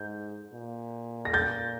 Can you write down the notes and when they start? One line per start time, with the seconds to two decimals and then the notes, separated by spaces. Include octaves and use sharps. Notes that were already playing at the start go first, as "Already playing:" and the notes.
Already playing: G#2 G6
0.53 A#2
1.25 A#6
1.34 G6 A6